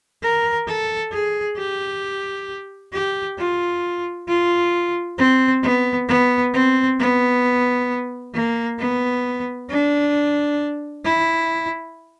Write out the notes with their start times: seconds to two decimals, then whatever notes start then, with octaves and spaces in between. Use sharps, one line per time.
0.23 A#4
0.67 A4
1.12 G#4
1.57 G4
2.93 G4
3.38 F4
4.28 F4
5.18 C4
5.63 B3
6.08 B3
6.54 C4
6.99 B3
8.33 A#3
8.79 B3
9.69 D4
11.04 E4